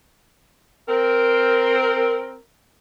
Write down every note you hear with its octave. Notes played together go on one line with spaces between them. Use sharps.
C4 A#4